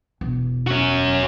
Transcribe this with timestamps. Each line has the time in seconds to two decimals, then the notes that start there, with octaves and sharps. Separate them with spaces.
0.21 E1
0.67 C#4 F#4